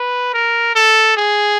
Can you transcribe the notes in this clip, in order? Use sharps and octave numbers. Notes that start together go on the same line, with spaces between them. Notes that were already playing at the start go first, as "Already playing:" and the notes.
Already playing: B4
A#4
A4
G#4